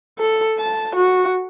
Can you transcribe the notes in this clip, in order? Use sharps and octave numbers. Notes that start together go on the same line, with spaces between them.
A4
A5
F#4